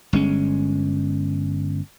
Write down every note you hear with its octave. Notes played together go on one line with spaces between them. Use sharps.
G1 G#3 C#4